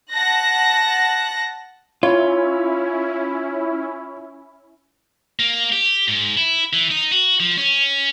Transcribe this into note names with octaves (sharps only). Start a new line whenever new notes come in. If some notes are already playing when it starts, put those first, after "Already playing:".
F#5 A5 F#6 A#6
C#4 E4 F4 C#5
A#3
G4
G#2
E4
E3
D#4
F#4
F3
C#4